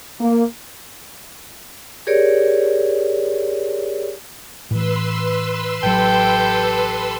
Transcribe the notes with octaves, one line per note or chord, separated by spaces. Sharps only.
A#3
G4 G#4 A#4 C#5 D5
A2 E3 B4 C6 E6
A1 F#3 G4 A4 G5